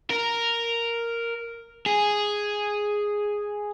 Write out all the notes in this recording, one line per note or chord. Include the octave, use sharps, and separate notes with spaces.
A#4
G#4